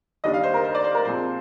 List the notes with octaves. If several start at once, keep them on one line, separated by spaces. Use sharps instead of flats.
D#2 D#3 G3 D4 D#5
F5
C5
A#4
C5
D5
C5
A#4
A#2 F3 G#3 C4 C5